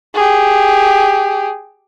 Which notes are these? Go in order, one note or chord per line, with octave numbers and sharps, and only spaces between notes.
G4 G#4